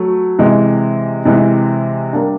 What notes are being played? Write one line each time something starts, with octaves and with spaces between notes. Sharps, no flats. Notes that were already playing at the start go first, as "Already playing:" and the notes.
Already playing: F#3 A3
C3 E3 G#3
C3 E3 G#3
G3 A#3 D4